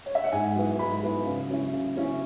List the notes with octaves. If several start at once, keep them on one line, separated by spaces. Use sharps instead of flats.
C#5
E5
F#5
G#2 G#5
F#3 B3 E4
G#2 B5
F#3 B3 E4
C#3
F#3 C#4 E4
C#3
F#3 C#4 E4